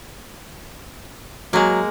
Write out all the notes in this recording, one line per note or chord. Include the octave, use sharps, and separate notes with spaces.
F#3 G#3 A#3